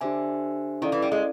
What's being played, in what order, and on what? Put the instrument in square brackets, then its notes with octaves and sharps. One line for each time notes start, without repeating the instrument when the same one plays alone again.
[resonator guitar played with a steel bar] D3 [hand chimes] D4 G4 C5 E5 G#5
[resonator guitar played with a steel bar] D#3 [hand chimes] C#4 E4 A4 D5 F5
[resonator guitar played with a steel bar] E3
G3
G#3